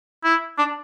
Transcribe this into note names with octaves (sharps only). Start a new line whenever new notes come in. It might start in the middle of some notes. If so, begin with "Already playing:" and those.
E4
D4